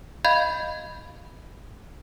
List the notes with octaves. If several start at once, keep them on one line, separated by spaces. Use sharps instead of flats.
D#5 F5 B5 G6 G#6